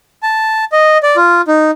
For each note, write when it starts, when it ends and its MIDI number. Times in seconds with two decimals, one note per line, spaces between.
0.23 0.65 81
0.72 0.98 75
1.03 1.16 74
1.16 1.41 65
1.48 1.71 63